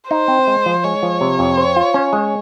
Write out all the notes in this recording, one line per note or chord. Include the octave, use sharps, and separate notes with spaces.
D#4 C5
C4
G#3
F3
G#3 C#5
F3
C3
F2
C5
F4
C#4
G#3